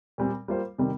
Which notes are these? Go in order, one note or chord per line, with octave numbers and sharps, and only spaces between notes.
A#2 G3 C4
G3 A#3 F4 C5
C3 D#3 G3 C4